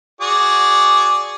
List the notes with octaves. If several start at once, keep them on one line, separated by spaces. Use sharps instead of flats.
F#4 G#4 D5